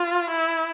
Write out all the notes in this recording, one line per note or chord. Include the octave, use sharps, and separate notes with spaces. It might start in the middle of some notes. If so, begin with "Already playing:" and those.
Already playing: F4
E4